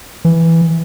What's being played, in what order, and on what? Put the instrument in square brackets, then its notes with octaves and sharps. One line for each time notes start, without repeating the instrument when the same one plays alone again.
[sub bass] E3